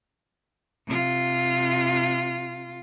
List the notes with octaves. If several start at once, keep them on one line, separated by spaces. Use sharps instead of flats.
C3 F4